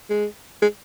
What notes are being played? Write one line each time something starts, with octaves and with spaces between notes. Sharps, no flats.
G#3
G#3